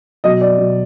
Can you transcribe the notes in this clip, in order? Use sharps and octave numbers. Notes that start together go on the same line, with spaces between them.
B2 F#3 D#5
D5
B2 F#3